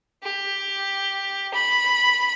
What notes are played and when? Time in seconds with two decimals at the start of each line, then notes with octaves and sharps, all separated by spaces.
0.23 G4
1.54 B5